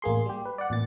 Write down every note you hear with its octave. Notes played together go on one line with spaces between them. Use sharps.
A1 A#3 G#4 C6
G3 G4
B4
D5 F#5
A1 A#2 A6